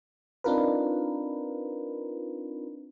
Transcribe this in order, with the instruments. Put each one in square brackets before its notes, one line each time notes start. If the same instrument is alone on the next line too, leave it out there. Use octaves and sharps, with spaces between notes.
[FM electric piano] C4 D4 D#4 F4 A#4 B4